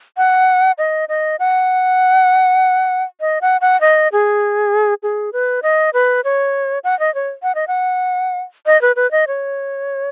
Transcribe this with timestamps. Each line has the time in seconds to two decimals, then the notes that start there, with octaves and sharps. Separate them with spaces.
0.17 F#5
0.78 D#5
1.09 D#5
1.40 F#5
3.21 D#5
3.41 F#5
3.61 F#5
3.81 D#5
4.12 G#4
5.03 G#4
5.33 B4
5.63 D#5
5.94 B4
6.24 C#5
6.84 F#5
6.99 D#5
7.15 C#5
7.43 F#5
7.55 D#5
7.68 F#5
8.66 D#5
8.82 B4
8.96 B4
9.11 D#5
9.27 C#5